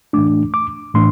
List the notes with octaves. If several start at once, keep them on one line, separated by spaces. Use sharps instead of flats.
A2 E3 A3 D4 D6
D6
A2 E3 A3 D4 C6